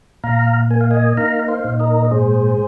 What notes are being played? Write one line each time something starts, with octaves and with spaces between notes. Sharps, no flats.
A#2 F5 A#5
A#3 G#5
F5
D#5 G#5
D#4 F5 A#5
C5 F5
A#2
A#4 D#5
D#5
G#2 G#4 C5